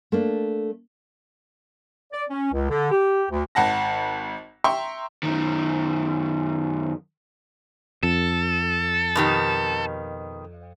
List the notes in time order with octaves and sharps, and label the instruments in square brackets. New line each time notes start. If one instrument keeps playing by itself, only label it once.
[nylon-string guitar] A3 A#3 D4
[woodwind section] D5
C#4
C#2
D3
G4
D2
[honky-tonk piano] G#1 F#5 A5 A#6
E5 G5 A#5 C6 C#6
[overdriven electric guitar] F#2 D#3
[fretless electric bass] F2 [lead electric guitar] A4
[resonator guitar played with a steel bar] B2 D#3 G4